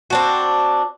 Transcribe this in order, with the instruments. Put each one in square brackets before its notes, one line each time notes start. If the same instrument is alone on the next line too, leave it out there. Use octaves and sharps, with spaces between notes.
[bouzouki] C4 D4 F#4